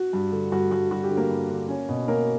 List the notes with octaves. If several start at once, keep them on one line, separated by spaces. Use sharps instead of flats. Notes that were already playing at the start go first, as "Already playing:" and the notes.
Already playing: F#4
G2
D3
G2 F#4
G2 F#4
G3 F#4
G4
D3
A#3 A#4
G2
D3
C#4
B2
A#3 C#4 A#4